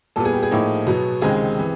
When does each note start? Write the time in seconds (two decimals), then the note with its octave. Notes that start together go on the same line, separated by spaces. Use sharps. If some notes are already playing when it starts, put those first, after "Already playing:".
0.16 A#2 G3 B3 A4
0.25 G#4
0.34 G4
0.43 G#4
0.51 A2 F3 A#3 D#4
0.87 B2 F#3 B3
1.21 C#2 C3 D#3 G#3 C4 G#4
1.58 C3 E3